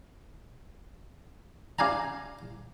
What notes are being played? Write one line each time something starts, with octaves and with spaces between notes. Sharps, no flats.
D4 F5 G#5 A#5